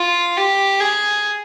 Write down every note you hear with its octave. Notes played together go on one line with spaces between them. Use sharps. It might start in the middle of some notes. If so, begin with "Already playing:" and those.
Already playing: F4
G4
G#4